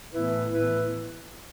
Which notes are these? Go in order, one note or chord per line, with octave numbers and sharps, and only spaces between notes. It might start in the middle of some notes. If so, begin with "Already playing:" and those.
A2 E3 B3 E4 B4
A2 E3 B3 E4 B4